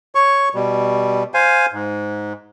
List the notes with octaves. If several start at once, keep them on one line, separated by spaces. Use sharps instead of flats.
C#5 C#6
B2 G3
C5 F5 G#5
G#2